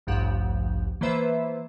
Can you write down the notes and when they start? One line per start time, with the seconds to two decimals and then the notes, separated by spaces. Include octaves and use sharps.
0.07 A1 D2 G2 F3 G4 F#5
1.01 E3 A#3 B3 B4 C5 E5